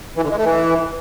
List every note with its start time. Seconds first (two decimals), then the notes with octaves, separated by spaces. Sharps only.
0.17 E3
0.24 D3
0.31 G#3
0.38 A3
0.45 E3